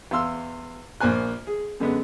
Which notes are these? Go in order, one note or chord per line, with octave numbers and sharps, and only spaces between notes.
E2 F5 C6 E6
A#1 A#3 C5 G#5 F#6
G#4
F#2 D3 G#3 B3